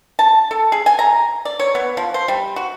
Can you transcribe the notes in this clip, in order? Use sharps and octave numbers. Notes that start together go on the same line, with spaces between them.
A5
A4
G#4
G#5
A#5
D5
C#5
B3
F3
C5
G3
F#4